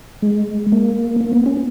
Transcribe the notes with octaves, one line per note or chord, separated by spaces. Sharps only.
G#3
A#3
A#3
B3
C#4